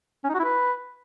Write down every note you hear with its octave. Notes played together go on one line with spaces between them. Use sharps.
C#4
D#4
F#4
E4
B4